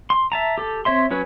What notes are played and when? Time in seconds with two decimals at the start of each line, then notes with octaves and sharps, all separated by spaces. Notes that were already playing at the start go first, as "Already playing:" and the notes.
0.10 C6
0.32 E5 A5 A#5
0.58 G4 A4
0.85 C4 C#5 E5 C6
1.11 F#3 C#4 B4 C#5